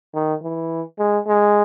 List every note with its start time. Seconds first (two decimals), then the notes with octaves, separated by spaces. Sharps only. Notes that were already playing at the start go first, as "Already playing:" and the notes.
0.15 D#3
0.43 E3
0.99 G#3
1.27 G#3